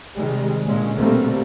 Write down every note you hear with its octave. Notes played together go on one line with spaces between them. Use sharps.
C3 D#3 G3 G#3
A#2 D3 G#3 C#4
B2 D3 G3 A3 A#3 C4